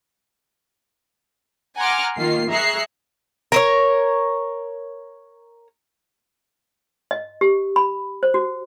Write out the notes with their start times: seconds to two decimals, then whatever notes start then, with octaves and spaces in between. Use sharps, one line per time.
1.76 F#5 G#5 A#5 C6 D6 F6
2.16 D#3 A#3 F4 C7
2.50 G#4 E5 A#5 C#6 F#6 C7
3.52 A#4 C5 C#5
7.11 D#5
7.41 G4
7.76 B5
8.23 C5
8.34 F#4